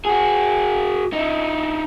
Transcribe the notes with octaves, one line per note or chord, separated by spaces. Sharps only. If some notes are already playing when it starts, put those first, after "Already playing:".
F#4 G#4
D#4 E4